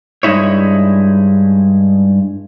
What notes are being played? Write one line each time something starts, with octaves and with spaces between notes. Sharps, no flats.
G2 G#3 D#4 E4 C#5